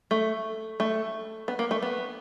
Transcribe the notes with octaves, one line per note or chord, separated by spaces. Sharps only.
A3
A3
B3
A#3
A3
B3